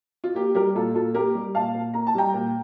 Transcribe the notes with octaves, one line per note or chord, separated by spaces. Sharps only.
F4
A#3 G4
G3 G4 A#4
A#2 F4 A4
A#2 F4 A4
A#3 G4 A#4
G3
A#2 F5 A5
A#2
A#3 A#5
A5
G3 G5 A#5
A#2